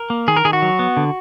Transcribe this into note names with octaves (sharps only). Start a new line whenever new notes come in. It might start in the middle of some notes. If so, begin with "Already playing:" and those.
Already playing: A#4
A#3
D#3 G#4
A#4
D#3 G#4
F#4
F#3
B3
D3